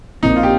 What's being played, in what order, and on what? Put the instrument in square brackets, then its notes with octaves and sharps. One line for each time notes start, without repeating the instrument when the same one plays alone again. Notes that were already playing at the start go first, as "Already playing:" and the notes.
[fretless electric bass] A#1 A#2 F3 C4 [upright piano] D#4
[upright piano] F4
G4